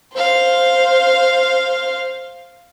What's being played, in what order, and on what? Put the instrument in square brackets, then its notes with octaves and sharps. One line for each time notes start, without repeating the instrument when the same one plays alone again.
[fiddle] C5 F5